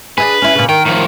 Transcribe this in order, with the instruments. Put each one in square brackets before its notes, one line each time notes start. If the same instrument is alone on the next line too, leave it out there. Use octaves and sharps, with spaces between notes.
[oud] D4 E4 G#4 [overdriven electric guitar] B4
[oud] C#4 E4
A#2 C#3
[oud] D#3 [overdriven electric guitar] G5
[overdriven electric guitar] A2 F3